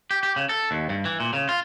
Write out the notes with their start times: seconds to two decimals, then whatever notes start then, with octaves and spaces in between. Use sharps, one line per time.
0.11 G4
0.23 G4
0.36 C#3
0.49 A4
0.71 D#2
0.89 G2
1.05 E3
1.20 A#2
1.33 C#3
1.49 F4